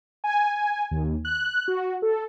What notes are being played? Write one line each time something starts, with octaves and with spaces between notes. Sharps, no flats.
G#5
D#2
F#6
F#4
A4